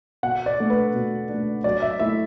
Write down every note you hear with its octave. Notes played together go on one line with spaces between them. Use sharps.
B2 F#5
D5
A3 D4
B4
B2
A3 D4
F#3 D5
E5
A3 E4 E5